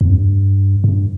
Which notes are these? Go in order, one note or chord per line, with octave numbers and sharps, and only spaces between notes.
F2
G2
G2